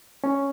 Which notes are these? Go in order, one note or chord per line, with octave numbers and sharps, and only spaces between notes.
C#4